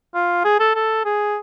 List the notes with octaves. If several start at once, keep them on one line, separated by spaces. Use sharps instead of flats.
F4
G#4
A4
A4
G#4